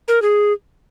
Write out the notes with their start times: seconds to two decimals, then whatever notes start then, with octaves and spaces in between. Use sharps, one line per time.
0.08 A#4
0.22 G#4